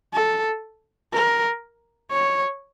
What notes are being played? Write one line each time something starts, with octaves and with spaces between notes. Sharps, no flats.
A4
A#4
C#5